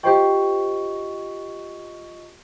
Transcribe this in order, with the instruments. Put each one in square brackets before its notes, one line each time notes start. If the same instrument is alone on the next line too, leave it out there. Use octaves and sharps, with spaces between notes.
[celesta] F4 D#5 C#6 [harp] G4 C5 G5